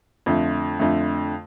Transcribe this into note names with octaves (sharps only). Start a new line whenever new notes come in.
F2 D3 A3
F2 D3 A3